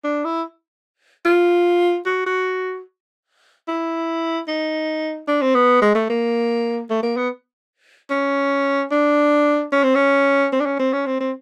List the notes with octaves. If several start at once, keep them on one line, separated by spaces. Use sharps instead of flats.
D4
E4
F4
F#4
F#4
E4
D#4
D4
C4
B3
G#3
A3
A#3
A3
A#3
B3
C#4
D4
C#4
C4
C#4
C4
D4
C#4
C4
C#4
C4
C4